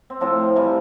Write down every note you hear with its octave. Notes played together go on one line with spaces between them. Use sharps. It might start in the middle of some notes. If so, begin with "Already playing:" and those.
C4
A2 F3 C4
C3 E3 G3